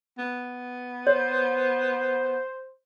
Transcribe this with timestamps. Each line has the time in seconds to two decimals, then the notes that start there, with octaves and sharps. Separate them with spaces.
0.18 B3
1.07 C5 C#5